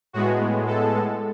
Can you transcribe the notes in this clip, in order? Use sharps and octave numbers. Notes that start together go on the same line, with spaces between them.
A2 G#3 B3 F#4
A4